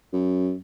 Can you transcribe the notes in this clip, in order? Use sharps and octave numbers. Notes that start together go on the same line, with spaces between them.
F#2